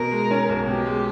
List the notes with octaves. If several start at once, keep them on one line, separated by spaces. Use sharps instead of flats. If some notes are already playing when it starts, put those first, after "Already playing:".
Already playing: B2 A#4
G#3
C#4
B1
B2 G4
G#3